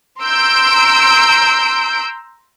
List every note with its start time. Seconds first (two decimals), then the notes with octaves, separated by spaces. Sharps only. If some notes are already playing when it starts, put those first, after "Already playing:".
0.21 A#5 C6 E6 G6 D7